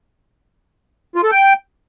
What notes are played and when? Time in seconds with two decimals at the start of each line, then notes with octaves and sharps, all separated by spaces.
1.16 F4
1.24 A4
1.31 G5